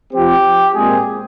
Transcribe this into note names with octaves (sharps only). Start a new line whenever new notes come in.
F3 C4 G4
A#2 G#3 C4 G#4